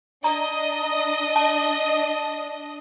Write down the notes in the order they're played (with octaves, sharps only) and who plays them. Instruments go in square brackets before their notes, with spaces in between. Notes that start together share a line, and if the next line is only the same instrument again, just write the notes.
[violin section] D4 D#5 [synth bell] A#5
[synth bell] A5